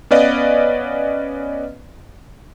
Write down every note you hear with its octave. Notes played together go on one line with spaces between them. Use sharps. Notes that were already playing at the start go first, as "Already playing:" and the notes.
B3 C#4 B4 D5 D#5 F5